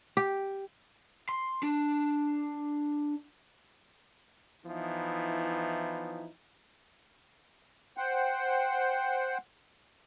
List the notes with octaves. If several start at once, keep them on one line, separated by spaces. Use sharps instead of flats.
G4
C6
D4
E3 F3 B3 D#4 E4
C5 F#5 G5